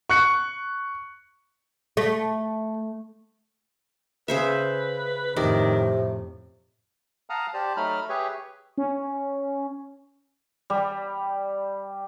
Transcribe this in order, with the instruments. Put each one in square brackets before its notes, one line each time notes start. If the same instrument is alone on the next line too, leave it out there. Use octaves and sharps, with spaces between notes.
[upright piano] C#6 F#6 C#7
[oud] A3
[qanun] C#3 C5 E5 [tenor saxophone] B4
[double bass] F2 A2 [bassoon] C3 [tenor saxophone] D#3 [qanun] D5
[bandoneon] F5 F#5 A5 A#5 D#6 F6
G4 C5 D5 A5
F#3 A3 D#4 B5 F6
G4 G#4 B4 C#5 E5
[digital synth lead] C#4
[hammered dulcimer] G3